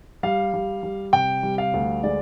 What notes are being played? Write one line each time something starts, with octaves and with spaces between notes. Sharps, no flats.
G3 F5
G3
G3
C3 G5
G3
F5
D2
G#3 D5